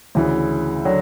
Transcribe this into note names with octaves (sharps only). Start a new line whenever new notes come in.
D2 C#3 E3
D3 F#3